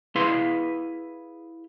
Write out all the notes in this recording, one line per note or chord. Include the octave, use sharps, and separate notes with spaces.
E4 G#4 B4 F5 C6